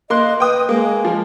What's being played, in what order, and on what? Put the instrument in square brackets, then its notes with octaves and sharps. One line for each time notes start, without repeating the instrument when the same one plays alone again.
[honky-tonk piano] A#3 C6 F#6 [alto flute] D#5
[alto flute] B4 [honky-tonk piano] G5 D#6
[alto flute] G#3 [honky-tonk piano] A#3
[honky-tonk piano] F3